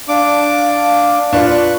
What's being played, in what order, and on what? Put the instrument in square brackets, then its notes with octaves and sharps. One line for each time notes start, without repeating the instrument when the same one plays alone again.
[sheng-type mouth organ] D4 D6 [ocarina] F5
[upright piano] D4 F4 [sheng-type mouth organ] B4 C#6 F#6